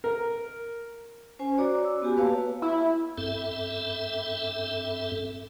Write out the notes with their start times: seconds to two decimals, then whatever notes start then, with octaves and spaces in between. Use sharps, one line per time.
0.04 A#4
1.39 C#4 C5 G#5
1.58 F#4 C#5 D5 A#5 D6
1.84 E6
2.02 B3 F#4 G4 G#5
2.16 A#3 B4 C#5 F5 A5
2.62 E4
3.18 G2 C4 A4 E5